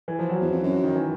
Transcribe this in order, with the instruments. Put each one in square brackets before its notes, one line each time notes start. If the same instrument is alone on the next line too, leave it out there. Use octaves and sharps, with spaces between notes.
[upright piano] E3
F3
F#3
[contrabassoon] E2
F2
F#2
[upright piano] D#3
E3